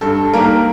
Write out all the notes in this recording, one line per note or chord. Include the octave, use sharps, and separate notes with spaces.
G2 A4
D#3 G3 A#3 A#4